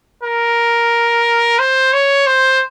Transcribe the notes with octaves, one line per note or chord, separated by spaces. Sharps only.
A#4
C5
C#5
C5